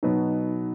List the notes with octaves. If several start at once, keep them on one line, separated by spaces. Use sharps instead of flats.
B2 F#3 B3 D#4